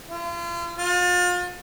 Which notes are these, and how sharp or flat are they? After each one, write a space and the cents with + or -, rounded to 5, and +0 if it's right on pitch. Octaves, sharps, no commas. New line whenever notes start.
F4 -40
F4 +35